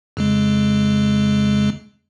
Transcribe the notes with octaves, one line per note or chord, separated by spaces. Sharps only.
F2 C#3 G#3